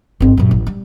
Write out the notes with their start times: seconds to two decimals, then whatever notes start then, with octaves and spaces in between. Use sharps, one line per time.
0.20 G1 C4
0.37 F#2 A#2
0.51 A1
0.67 G3